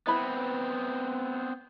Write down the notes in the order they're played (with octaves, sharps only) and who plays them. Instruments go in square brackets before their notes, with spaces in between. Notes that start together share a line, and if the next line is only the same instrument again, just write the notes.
[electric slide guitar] B3 C4 [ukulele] E4 B4 B5